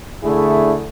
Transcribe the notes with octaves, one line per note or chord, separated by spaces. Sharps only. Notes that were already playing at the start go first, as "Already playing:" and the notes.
D3 A3 E4 G#4